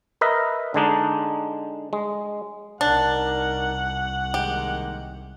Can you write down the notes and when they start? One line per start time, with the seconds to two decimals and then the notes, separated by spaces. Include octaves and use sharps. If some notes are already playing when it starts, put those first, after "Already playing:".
0.21 A#4 B4 D#5 E5
0.74 D3 G#3 D4 D#4
1.93 G#3
2.81 C2 D4 D#4 A#4 F#5
4.34 D#3 G#3 A#3 G4